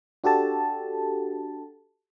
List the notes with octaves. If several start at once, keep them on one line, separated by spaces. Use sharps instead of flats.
D4 F#4 G4 A4 A5